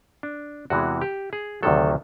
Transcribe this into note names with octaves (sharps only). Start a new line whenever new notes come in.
D4
E2 C3 E3 G#3 F#4
G4
G#4
D2 C3 D#3 F#3 A4